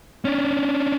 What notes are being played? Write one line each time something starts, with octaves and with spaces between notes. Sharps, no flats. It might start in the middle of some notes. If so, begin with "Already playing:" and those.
C#4 D4